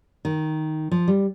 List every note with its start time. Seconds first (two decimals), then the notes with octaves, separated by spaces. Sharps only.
0.25 D#3
0.91 F3
1.08 G3